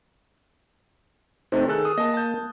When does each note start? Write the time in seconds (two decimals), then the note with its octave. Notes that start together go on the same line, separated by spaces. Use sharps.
1.52 C3 A3 C4 D#4 C5
1.68 D#3 G#4 A4 F#6
1.85 D#6
1.98 A#3 D#5 A5
2.14 A5 G6